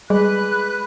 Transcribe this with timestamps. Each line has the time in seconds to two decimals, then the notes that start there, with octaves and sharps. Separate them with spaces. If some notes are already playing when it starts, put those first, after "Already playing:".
0.10 G3 G#3 G#4 B4 F#6